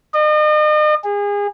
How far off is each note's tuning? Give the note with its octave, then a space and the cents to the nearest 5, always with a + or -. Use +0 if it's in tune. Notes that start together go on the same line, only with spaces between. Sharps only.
D#5 -40
G#4 -30